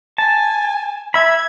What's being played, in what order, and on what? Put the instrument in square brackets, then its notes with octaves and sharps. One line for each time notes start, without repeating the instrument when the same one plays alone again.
[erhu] G#5 [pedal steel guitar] A5
[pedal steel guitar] E5 B5 [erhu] G#6